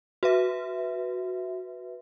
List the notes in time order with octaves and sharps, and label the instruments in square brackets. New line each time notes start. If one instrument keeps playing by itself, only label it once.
[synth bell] F#4 B4 E5